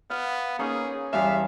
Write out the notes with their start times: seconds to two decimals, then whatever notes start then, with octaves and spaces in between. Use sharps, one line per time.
0.10 B3 F5
0.59 A#3 C#4 D#4 G#4
1.13 E2 G2 E5 F5